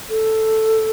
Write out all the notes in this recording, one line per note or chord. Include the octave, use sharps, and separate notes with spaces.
A4